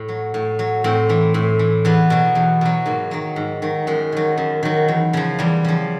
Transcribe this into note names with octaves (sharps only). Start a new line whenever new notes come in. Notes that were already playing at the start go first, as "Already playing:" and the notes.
Already playing: A2
F#3
A2
F#3
A2 C4
E3
A2
E3
E2 B3
B2 F#3
E2
B2 F#3
G#2 A#3
D#3 F#3
G#2
D#3 F#3
F#2 G#3
D#3 F#3
F#2
D#3 F#3
E2
C#3 F3
E2 G3
C#3 F3